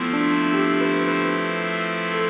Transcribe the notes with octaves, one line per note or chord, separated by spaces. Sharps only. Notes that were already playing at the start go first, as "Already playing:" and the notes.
Already playing: F3 A3 B3 C4 E4
D4
G4
B4
B4
A4